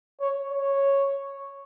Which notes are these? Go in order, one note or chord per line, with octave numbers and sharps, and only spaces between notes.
C#5
C#5